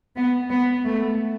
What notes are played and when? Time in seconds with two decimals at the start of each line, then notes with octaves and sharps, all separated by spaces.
0.17 B3
0.51 B3
0.86 A3